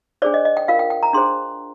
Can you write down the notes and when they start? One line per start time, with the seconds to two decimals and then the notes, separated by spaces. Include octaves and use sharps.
0.22 D4 G#4 C5 D5
0.34 D#5
0.45 D#5
0.57 G5
0.68 F4 A#4 F5
0.79 G5
0.90 G5
1.03 A#5
1.13 D4 G#4 C5 C6